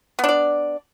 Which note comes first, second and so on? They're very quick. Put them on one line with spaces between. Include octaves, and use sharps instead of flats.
B3 D4 D5